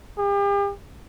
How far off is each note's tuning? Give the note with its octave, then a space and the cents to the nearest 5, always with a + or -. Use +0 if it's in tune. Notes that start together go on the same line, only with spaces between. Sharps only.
G4 +40